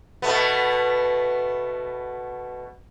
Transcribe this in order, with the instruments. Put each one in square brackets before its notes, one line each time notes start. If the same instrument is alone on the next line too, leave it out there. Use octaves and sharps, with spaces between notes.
[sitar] B2 A3 B3